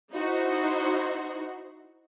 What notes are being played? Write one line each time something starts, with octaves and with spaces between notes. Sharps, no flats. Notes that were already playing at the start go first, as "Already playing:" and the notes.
D#4 E4 F#4 C5